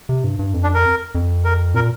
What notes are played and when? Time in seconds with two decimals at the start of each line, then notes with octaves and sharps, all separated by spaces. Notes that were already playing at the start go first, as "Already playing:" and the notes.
0.09 C3
0.24 G2
0.39 G2
0.54 F2
0.63 D4
0.74 A#4
1.15 F2
1.45 A#4
1.74 A#2 A#4